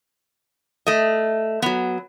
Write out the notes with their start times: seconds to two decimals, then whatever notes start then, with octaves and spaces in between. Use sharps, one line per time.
0.87 A3 D#5
1.62 F#3 B3